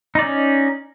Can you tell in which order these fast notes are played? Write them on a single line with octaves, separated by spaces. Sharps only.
D#4 D5 C#4